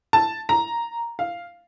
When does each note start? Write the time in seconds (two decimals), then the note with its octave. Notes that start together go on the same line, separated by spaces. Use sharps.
0.13 A5
0.49 A#5
1.19 F5